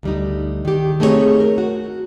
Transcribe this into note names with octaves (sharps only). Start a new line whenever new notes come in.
D2 G3 D#4
D#3 G4
A3 C4 D#4 G#4 A4 C#5
A#4
F#4